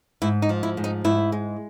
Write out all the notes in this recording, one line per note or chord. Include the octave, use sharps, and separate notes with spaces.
G#2 E4
D#4
F3
E4
G#2
D#4
G#2 E4
G#3